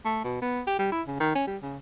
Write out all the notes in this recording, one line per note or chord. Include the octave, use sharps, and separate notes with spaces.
A3
B2
B3
G4
G3
E4
C#3
D#3
C#4
G3
C#3